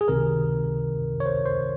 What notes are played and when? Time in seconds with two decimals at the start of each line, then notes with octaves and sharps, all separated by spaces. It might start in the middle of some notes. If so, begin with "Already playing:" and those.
0.01 G#4
0.08 C#2 C3 D#3 A#4
1.20 C#5
1.26 C5
1.46 C5